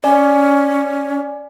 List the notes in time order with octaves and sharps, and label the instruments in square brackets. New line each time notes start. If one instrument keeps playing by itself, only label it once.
[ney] C#4 [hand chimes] D5 G#5